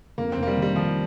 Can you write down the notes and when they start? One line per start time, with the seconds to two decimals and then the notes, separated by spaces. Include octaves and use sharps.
0.18 F2 A#3
0.32 F1 C4
0.43 A#3
0.47 G3
0.57 D#3
0.62 G3
0.76 D#3 F3